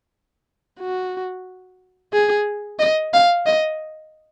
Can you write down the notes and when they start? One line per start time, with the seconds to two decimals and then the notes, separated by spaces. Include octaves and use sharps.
0.80 F#4
2.13 G#4
2.79 D#5
3.13 F5
3.46 D#5